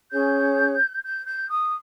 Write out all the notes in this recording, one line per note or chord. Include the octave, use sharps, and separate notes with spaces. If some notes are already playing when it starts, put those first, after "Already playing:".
C#4 G#4 C#5 G6
G6
G6
D#6